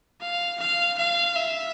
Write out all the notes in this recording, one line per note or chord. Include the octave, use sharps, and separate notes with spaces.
F5
F5
F5
E5